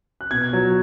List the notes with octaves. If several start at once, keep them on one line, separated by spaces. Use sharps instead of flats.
F#6
B2 G#6
F#3